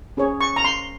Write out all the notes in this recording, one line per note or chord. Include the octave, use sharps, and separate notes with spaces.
C#4 G#4 C#5
C#6
A#5
C6